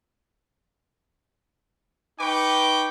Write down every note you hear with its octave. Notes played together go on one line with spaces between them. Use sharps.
D#4 B4 G5 C#6 D6